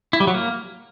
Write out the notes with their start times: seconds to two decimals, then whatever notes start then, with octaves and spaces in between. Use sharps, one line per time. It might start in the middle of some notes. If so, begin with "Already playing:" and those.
0.13 E4
0.20 G3
0.27 F#3
0.34 A#3